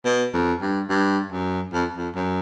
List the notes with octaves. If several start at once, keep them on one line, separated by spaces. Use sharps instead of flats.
B2
F2
G2
G2
F#2
F2
F2
F#2